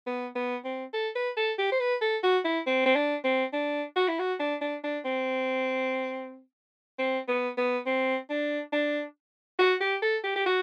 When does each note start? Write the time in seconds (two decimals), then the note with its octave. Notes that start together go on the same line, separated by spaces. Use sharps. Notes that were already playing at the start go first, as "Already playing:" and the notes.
0.07 B3
0.36 B3
0.65 C4
0.93 A4
1.15 B4
1.37 A4
1.58 G4
1.72 C5
1.80 B4
2.02 A4
2.23 F#4
2.44 E4
2.67 C4
2.86 C4
2.95 D4
3.24 C4
3.53 D4
3.96 F#4
4.08 E4
4.19 F#4
4.40 D4
4.61 D4
4.84 D4
5.05 C4
6.99 C4
7.28 B3
7.57 B3
7.86 C4
8.29 D4
8.73 D4
9.59 F#4
9.81 G4
10.02 A4
10.24 G4
10.36 G4
10.46 F#4